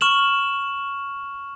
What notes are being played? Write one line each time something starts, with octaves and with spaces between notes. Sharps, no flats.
C#6 F6 E7 F#7